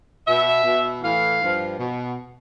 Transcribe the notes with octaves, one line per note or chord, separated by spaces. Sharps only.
B2 E5
B2
A2 E3 F5
G2 F3
B2